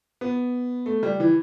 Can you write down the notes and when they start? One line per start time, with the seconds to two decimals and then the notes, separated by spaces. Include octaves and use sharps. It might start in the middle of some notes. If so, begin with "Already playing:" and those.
0.21 B3
0.86 A3
1.03 G3
1.20 E3